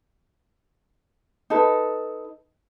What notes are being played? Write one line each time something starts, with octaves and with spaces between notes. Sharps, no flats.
D#4 A4 B4